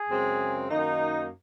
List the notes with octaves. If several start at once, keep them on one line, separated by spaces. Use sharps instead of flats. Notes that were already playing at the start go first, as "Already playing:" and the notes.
Already playing: G#4
F#2 C#3 G#3 C4
F#2 D#3 A#3 D#4